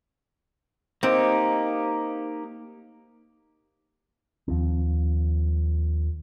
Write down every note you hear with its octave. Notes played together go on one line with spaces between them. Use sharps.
A#3 C4 D#4 G4
D#2 F3 C4